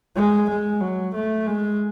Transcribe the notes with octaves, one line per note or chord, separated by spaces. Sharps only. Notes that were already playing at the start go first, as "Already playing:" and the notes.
G#3
G#3
F#3
A3
G#3